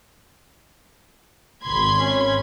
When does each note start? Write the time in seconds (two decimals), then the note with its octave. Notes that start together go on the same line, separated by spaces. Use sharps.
1.64 G#1 B5 C6 G#6
1.99 C#4